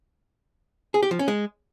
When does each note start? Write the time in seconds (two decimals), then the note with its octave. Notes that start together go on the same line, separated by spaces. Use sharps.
0.94 G#4
1.03 G4
1.11 F3
1.19 C#4
1.28 G#3